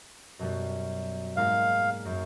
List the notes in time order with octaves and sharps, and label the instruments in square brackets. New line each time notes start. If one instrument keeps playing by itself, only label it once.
[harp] F#2 B2 G3
[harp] G#2 G#3 A#3 [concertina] F5
[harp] F#2